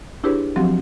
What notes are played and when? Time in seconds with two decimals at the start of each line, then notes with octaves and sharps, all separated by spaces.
0.23 D4 E4 G4 G#4 B4 C#5
0.56 F3 F#3 C4 F#4 G4